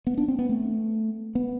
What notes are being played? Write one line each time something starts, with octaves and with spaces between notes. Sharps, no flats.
B3
D4
C4
B3
A3
B3